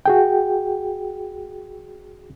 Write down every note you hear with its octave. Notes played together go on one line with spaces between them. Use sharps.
F#4 G#4 G5